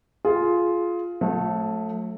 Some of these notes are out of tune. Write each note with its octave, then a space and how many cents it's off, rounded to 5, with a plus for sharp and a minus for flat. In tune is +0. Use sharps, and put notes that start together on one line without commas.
F4 +0 G#4 +20
F#3 -45 A3 +0